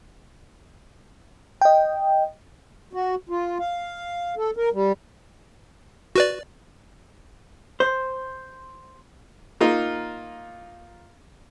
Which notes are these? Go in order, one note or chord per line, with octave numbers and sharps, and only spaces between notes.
D#5 G5
F#4
F4
F5
A4
A#4
G3
F#4 B4 D5
C5
A#3 D#4 F4